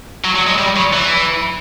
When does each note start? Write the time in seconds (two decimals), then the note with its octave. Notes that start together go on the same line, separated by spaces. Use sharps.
0.25 F#3
0.36 F#3
0.47 G#3
0.58 G3
0.76 F#3
0.93 E3